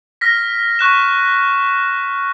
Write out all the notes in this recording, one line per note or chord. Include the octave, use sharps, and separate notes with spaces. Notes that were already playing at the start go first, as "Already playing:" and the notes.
F6 A#6 B6
C#6 F#6 E7